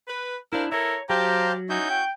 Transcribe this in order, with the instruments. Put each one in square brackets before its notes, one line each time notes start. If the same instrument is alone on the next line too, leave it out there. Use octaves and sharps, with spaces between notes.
[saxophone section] B4
[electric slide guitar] D4 E4 [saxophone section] A#4 C5 F5
[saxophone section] E4 A4 A#4 [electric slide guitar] C#5 [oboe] A#5
[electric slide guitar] F#3 [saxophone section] G4 [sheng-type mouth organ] C5 F5 A5 [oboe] A#5
[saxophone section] C#4 E4 F#4 [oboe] D#4 [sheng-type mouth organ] G6
[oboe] G5